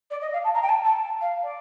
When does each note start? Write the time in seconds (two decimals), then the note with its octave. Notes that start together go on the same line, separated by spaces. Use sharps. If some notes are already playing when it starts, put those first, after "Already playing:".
0.10 D5
0.22 D#5
0.33 F5
0.44 A5
0.54 A#5
0.62 G5
0.69 A5
0.84 A5
1.21 F5
1.43 D5